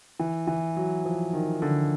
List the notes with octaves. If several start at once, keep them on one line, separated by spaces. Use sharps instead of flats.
E3
E3
F#3
F3
D#3
D3